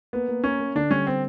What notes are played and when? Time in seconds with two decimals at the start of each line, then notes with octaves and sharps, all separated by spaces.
0.13 A#3 B3
0.28 A#3
0.44 A#3 C#4
0.59 A#3
0.75 D3 D4
0.90 G3 C#4
1.07 C4